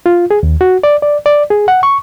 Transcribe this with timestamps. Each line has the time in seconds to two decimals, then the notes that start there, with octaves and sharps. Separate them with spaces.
0.06 F4
0.31 G#4
0.43 D#2
0.61 F#4
0.84 D5
1.02 D5
1.26 D5
1.50 G#4
1.68 F#5
1.83 C#6